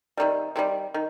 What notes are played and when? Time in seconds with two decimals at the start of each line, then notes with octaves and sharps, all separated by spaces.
0.17 C3 D#3 G3
0.56 C3 D#3 G3
0.94 D#3